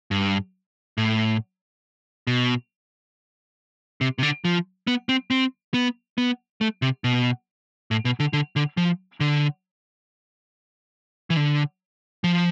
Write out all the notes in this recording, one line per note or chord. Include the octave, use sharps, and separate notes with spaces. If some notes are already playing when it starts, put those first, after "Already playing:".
G2
A2
B2
C3
C3
D3
F3
B3
C4
C4
B3
B3
A3
C3
B2
A2
B2
D3
D3
D3
F3
D3
E3
D3
F3